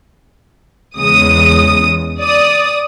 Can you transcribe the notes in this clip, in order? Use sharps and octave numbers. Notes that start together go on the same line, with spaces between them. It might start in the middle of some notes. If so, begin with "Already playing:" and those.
E2 C#3 G#3 D#6
D5 D#6